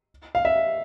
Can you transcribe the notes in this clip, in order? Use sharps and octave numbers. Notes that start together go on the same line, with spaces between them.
F5
E5